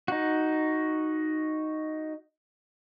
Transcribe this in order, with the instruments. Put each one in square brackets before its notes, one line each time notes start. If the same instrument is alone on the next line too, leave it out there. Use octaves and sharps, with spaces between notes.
[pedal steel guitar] D#4 F#4